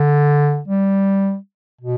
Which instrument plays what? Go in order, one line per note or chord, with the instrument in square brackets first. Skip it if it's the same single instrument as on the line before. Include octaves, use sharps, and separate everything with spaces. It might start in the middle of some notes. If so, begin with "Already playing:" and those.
Already playing: [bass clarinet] D3
G3
B2